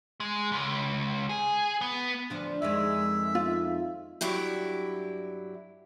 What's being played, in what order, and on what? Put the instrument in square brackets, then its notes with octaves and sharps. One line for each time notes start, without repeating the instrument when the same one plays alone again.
[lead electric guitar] G#3
C#2
G#4
B3
[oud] D2 F3 D4
[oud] F2 D#3 G#3 [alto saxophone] E5
[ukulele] F4
[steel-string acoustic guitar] G2 F#3 E4 G4